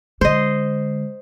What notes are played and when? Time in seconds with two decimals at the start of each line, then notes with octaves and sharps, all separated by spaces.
0.21 D3 G#3 C5 D#5